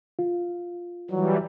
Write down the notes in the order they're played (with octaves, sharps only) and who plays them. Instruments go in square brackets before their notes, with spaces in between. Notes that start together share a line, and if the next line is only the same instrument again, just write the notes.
[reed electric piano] F4
[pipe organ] E3 G3 [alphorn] F#3